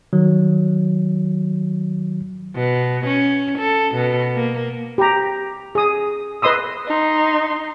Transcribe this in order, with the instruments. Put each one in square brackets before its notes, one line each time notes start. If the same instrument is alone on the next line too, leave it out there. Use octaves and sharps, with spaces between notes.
[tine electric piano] D#3 F#3
[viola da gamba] B2
C#4
A4
B2
A#3
[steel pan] G4 A#5
G#4 D#6
B4 D#5 C6 D#6 E6
[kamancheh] D#4 C6